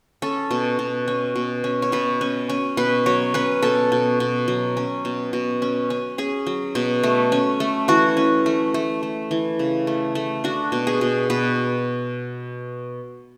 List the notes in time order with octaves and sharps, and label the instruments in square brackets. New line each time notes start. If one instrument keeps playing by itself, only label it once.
[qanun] C#4 A4
B2
B2
C#4
B2
C#4
C#5
B2 B4
C#4
C#4
B2 B4
F#3 C#5
C#4 B4
B2 A4
B2
B2
F#3
C#4
B2
B2
C#4
C#4
C#4 G#4
F#3
B2
A3
C#4
A3
E3 F#4
C#4
A3
A3
A3
E3
C#3
A3
A3
D4 F#4
B2
G#4
B2
B2 B4